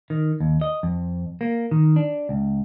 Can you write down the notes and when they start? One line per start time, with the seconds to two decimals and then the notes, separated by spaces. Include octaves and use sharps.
0.10 D#3
0.40 D#2
0.61 D#5
0.83 F2
1.41 A#3
1.71 D#3
1.96 D4
2.29 C#2